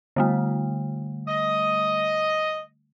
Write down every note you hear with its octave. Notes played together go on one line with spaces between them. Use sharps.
D3 G3 A3
D#5